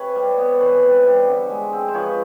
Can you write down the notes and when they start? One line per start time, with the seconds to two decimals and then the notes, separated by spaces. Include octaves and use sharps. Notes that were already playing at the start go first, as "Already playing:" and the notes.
Already playing: C3 B4 C#5
0.15 G3
0.38 B3
0.60 E3 B4 C#5
0.83 C3
1.05 G3
1.27 D3
1.50 G#3
1.72 C4
1.88 C5
1.94 F3 B4 C#5